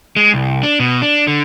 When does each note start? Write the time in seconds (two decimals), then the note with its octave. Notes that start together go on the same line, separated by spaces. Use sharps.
0.16 G#3
0.34 C2
0.63 D4
0.80 B2
1.02 D4
1.27 D3